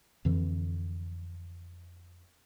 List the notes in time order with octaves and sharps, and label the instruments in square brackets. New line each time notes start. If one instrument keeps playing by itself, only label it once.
[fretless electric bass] F2 D3 E3